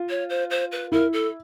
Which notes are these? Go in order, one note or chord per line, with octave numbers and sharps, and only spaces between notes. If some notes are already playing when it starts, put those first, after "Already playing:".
Already playing: F4
C#5
C5
C5
B4
E4 A#4
A4